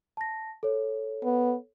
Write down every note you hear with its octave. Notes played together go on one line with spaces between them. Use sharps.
A5 A#6
A4 C#5
B3